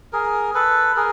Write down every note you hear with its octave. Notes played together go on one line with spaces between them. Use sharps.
G#4 A#4
A4 B4
G#4 A#4